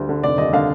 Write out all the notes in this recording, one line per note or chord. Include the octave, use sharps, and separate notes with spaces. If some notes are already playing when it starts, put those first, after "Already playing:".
Already playing: D2 G3
D3
F1 D5
D#2 D#5
D3 F5